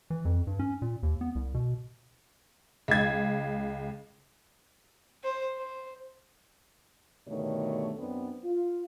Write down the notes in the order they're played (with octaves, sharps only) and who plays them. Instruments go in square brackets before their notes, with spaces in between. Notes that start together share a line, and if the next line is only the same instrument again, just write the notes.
[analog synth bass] E3
F2
G2
C#4
A#2
D#2
B3
C2
B2
[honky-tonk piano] C#2 G#6
[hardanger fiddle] C5
C5
[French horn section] G2 B2 D3 D#3 A3 C#5
F#2 B3 C4 D4
F4